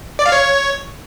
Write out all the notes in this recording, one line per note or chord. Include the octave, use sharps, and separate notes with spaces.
D5
F5
C#5